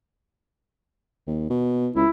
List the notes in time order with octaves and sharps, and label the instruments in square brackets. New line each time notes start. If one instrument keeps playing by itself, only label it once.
[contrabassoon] D#2
B2
[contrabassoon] C#2 [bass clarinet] E4